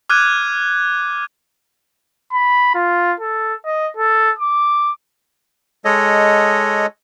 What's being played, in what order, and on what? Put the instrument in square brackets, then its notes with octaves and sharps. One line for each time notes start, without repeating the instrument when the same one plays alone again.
[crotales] D6 F6 F#6 G#6 D#7
[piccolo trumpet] B5
F4
A4
D#5
A4
D6
[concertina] G#3 A4 C#5 D#5